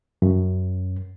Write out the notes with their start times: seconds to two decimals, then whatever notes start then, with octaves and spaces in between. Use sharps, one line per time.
0.22 F#2